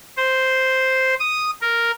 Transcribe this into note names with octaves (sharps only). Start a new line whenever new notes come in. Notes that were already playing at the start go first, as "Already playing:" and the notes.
C5
D#6
A#4